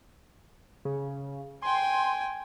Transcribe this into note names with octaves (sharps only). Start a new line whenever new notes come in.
C#3
G5 G#5 C6